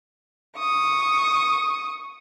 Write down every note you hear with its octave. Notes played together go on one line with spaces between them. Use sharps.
C#6 D#6